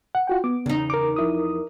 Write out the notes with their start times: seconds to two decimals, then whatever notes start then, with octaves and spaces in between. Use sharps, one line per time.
0.15 F#5
0.27 F4 F#4 G5
0.44 B3 D6
0.66 E2 C#3 D#4
0.90 A#4 D6
1.16 F3 E4 D#6